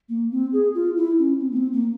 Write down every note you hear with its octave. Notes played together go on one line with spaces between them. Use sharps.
A#3
C4
G#4
F4
E4
C#4
C4
A#3
C4
A#3